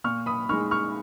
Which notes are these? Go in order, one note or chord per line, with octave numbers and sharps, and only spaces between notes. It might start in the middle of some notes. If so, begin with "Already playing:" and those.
A#2 C#6 F6
B5 D#6
G#3 D#4 C#6 F6
C#6 F6